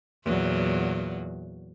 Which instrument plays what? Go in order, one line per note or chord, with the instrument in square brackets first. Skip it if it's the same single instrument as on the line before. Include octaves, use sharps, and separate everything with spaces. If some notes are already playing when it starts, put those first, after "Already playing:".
[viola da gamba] E2 A#2 F#3